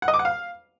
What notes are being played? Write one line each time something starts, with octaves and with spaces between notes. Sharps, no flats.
F#5
D#5
D6
F#5
F5